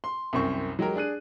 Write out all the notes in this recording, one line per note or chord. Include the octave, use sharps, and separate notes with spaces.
C6
C2 F#2 C4 C#6
F#3 G#3 G4 A#4
D4 G#4 F#6 D#7